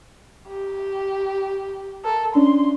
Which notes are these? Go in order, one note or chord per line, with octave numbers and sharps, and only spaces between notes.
G4
A4 A#4
C#4 D4 C6